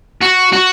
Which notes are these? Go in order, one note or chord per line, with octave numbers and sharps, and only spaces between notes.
F#4
F#4